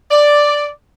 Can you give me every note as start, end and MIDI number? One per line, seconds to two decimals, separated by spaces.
0.11 0.68 74